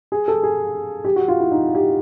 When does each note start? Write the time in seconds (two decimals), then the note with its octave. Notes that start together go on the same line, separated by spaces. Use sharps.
0.12 G#4
0.28 A4
0.43 G#4
1.05 G4
1.16 F#4
1.28 F4
1.40 E4
1.52 D#4
1.75 G4